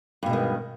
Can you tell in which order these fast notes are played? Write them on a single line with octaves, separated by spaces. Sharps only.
G2 B2 G#3 D#3